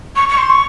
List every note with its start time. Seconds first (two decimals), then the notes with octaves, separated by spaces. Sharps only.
0.16 C#6
0.29 C#6
0.38 C6
0.50 C#6